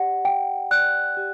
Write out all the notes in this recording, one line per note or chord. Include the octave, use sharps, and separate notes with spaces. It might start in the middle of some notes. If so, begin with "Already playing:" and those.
Already playing: G4 D5 F#5
G4 G5
D5 F#6
G4